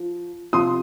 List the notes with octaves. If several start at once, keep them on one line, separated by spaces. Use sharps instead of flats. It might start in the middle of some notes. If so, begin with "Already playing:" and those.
Already playing: F3
C3 F3 C6 D#6